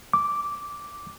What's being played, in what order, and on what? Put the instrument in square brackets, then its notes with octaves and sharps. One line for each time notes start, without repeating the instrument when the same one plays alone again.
[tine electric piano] D6